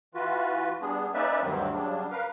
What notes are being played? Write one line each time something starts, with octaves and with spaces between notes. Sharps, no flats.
E3 F4 F#4 B4
G3 B3 D4 G#4
A#3 C#4 D#4 B4 D5 E5
D2 G2 D#3 F#3 G3 C4
C#3 F#3 G3 D4
A#4 B4 F5